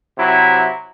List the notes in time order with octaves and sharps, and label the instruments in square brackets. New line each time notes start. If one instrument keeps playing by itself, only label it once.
[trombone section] C3 F#3 E4